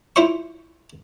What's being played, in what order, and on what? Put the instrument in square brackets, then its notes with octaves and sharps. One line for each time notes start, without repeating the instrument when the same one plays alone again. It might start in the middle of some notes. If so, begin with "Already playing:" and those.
[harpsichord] E4 F4 C5 E5 C#6